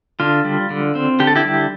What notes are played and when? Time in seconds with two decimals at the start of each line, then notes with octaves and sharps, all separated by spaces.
0.20 D3 F4
0.44 G3
0.70 D3
0.95 C4
1.20 D3 G4
1.27 A4
1.35 E4 G4
1.45 G3